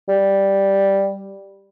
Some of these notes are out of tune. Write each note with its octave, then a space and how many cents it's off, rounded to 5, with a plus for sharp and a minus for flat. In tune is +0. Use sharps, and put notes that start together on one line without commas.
G3 +0